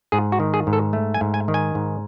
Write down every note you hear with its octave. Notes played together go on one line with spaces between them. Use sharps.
G#2 G#4
F#4
D#3
G#4
G#2
A4
A3
G#5
G#2
G#5
D#3
G#5
G#2